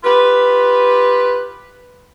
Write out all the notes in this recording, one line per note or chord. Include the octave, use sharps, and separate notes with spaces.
F4 G4 B4